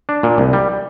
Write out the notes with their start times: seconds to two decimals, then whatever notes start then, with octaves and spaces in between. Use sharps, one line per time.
0.09 D4
0.23 A#2
0.38 C2
0.53 G3